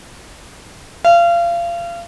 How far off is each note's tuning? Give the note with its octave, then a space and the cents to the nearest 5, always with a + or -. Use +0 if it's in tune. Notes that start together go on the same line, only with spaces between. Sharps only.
F5 -30